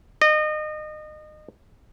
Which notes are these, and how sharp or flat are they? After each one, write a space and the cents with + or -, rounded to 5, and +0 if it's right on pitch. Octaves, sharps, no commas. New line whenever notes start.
D#5 -30